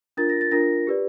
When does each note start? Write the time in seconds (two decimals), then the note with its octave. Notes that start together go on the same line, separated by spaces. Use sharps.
0.17 D4 F4 A#4 A6
0.29 A#6
0.41 A6
0.51 D4 F4 A#4 A#6
0.87 G4 B4 D5